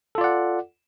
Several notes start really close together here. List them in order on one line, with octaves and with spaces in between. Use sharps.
A4 F4 D5 F#5